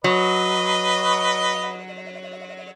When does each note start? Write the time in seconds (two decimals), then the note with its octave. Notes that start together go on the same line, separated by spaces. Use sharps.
0.04 F#3 B4 D#5